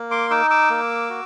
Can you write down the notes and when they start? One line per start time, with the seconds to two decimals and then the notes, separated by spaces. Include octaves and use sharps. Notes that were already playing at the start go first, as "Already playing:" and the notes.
Already playing: A#3
0.11 C6 D6
0.30 D#4 D6 E6
0.50 D6 E6
0.70 A#3
1.10 F#4